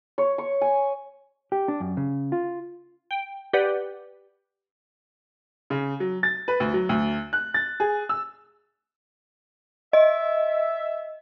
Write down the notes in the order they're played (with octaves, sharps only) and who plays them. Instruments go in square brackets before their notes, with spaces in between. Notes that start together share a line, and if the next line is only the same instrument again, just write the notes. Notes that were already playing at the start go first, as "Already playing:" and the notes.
[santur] C#5
C#6
G#5
[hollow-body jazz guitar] G4
D4
F#2
C#3
F4
[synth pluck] G5
G4 B4 D5 F#5
[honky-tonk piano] C#3
F#3
A6
B4
D2
F#3
D2
F#6
A6
G#4
E6
[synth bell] D#5 [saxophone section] E5